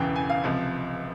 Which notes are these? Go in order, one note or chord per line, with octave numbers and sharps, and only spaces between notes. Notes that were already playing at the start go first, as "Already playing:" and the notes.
Already playing: E1 E2 C#3 E3 G5
G#5
F5
C#2 C3 F3